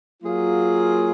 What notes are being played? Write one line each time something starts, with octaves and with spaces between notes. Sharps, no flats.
F#3 A#3 F4 G#4